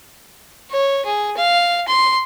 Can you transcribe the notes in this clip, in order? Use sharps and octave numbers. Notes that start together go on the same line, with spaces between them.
C#5
G#4
F5
C6